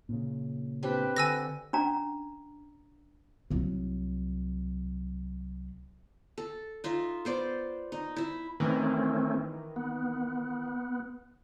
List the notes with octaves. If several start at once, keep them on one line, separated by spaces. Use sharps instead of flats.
A#2 C#3
C4 D4 G4 B4
D3 G#5 E6 A#6
C#4 D4 A#5
C2 F#3
A4
D#4 F4 E5
B3 C5 D5
D#4
E4 E5
D#3 E3 A3 C4 C#4
B3